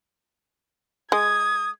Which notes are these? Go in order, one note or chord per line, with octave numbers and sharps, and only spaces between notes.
G#3 D#6 G#6